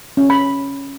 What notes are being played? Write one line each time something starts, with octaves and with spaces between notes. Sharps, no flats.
C#4
B5